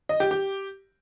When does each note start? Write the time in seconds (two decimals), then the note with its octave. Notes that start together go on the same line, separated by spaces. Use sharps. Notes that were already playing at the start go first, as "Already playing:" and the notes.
0.09 D#5
0.20 G4
0.31 G4